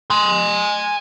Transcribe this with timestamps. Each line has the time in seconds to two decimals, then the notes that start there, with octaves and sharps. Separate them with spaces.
0.10 G#5 C6